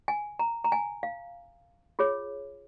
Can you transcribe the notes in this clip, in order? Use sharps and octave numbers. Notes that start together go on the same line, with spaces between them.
G#5
A#5
A#5
G#5
F5
F4 G#4 C#5